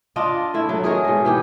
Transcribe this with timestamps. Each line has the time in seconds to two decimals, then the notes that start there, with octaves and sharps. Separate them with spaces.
0.16 D4 F4 D5 D#5
0.54 A2 E4
0.69 F#3 A3
0.84 G#4 A#4 C#5 D#5
1.05 G#2 B2
1.25 E3 B3 G4